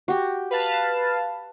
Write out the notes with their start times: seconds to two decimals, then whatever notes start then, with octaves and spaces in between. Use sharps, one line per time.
0.08 F#4 G4
0.51 B4 F5 A5